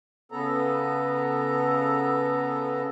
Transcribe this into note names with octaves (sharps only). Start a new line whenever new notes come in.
C#3 B3 A4 A#5